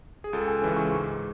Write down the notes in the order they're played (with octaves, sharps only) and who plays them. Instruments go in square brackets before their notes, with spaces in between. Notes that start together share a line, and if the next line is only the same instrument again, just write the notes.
[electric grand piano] G#4
C#2 A4
G#5
C#3 E3 G#3
C#6
G#2